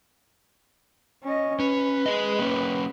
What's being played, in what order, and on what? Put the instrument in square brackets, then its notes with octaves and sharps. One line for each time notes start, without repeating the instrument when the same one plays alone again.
[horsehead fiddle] C#4 D#5
[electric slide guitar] C#4 [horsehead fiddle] B4
[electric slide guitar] G#4 D#5
A#3 C#4